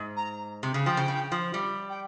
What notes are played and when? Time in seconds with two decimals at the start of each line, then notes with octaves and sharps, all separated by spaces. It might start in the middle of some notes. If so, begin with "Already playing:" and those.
Already playing: G#2
0.16 A#5
0.63 C3
0.74 C#3
0.86 F3 G5
0.97 C#3
1.08 C#3
1.32 F3
1.54 G3
1.89 G5